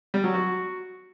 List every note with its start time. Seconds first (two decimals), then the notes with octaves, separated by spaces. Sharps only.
0.14 G3
0.24 F#3
0.34 F#4